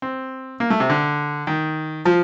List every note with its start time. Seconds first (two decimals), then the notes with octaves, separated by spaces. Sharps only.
0.02 C4
0.60 A#3
0.70 A3
0.80 C3
0.90 D3
1.47 D#3
2.05 F3